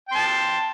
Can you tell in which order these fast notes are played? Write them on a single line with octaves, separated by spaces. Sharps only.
G5 C6 A5